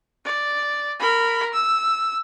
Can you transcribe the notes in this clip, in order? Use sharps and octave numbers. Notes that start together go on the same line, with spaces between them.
D5
A#4 B5
E6